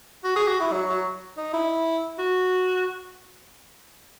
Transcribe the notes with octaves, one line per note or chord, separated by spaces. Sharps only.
F#4
G#4
F#4
E4
F#3
F#3
D#4
E4
F#4